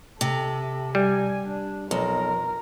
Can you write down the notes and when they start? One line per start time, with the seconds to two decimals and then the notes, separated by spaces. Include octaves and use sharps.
0.21 C3 A4
0.95 G3 G#5
1.47 D4
1.91 B1 F2 A#4